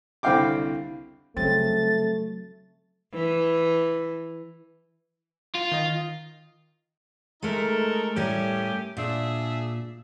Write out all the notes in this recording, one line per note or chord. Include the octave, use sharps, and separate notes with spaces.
C2 D3 C4 F5 G5 D6
C#3 F#3 G3 A3 C4 A6
E3
F4
D#3 D#5
G#3 A3 D#4 A4 A#4
A2 G3 A3 C#4 G4 A#4
A#2 D4 G#4 E5